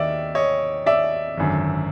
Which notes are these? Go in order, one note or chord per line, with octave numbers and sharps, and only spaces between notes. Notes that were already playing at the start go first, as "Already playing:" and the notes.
Already playing: D#2 D#3 D5 E5
C#5 D#5
D5 E5
G#1 F#2 D3